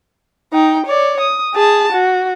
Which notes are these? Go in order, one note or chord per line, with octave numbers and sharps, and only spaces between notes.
D#4 G5
C#5 D5
D#6
G#4 A5
F#4